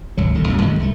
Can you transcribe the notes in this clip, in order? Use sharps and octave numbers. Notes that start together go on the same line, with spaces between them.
G#1 C#2 F#3
D#1 D#2 D3
C2 F#2
F#2 A2 D#3 G#3
C2 A3